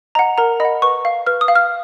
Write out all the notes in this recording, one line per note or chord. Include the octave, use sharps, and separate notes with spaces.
D#5 F#5 A#5
A#4 A#5
D#5 F#5 B5
B4 C#6
F5
B4 F6
D#6
F5
F6